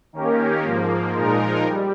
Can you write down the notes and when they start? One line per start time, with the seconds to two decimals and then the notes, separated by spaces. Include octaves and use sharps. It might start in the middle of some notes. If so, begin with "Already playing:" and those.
0.13 D#3 A#3 C#4 G4 A#4
0.63 G#2 F3 A#3
1.14 A#2 F3 G#3 D#4 A#4
1.64 G3